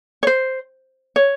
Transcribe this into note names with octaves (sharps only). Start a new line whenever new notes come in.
C#5
C5
C#5